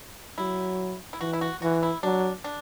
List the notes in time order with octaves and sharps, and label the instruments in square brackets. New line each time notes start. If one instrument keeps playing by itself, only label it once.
[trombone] F#3 [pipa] E4
[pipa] E4
[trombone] E3 [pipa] F#4
[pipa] E4
F#4
[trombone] E3 [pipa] F#4
[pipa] E4
[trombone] F#3 [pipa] D4
[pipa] D4